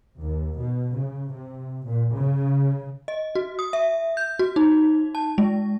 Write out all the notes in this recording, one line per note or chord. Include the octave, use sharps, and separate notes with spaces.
D#2
B2
C#3
C3
A#2
C#3
D#5
F#4
D#6
E5
G6
F#4
D#4
A5
G#3